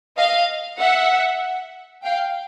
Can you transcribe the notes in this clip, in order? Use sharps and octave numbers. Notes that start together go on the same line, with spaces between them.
D#5 F5
E5 F#5
F5 G5